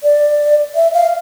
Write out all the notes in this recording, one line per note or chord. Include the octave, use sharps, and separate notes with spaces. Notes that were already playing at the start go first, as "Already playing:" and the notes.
D5
E5
F5